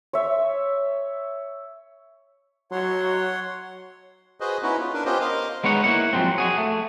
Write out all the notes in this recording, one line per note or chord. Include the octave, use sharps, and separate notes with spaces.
C#5 E5
F#3 C#5 F#5 C6
F#4 G#4 B4 C5 D#5
B3 C#4 D#4 E4 F#4 B4
F4
D4 A#4 B4
B3 C#4 F4 G4 C5 D#5
A#4 C5 D#5 F5
G#3 B3 D#4 C#5 F#5
A#3 E4 F#5
F3 F#3 G#3 C4
F#4 G#4
A3